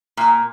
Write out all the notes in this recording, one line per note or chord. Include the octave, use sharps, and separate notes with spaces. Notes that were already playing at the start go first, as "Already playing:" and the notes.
A#2